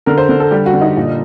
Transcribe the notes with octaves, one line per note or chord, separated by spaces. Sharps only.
D3 A#4
C5
D3
A4
G3 G4
F#4
D3
D#4
A#2